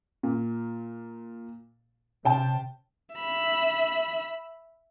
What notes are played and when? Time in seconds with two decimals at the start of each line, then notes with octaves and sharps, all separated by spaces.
0.23 A#2
2.25 C3 C#4 G5 A5
3.15 E5 B5